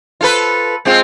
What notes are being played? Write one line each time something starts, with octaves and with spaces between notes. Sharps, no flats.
F4 A4 B4
G#3 C4 F4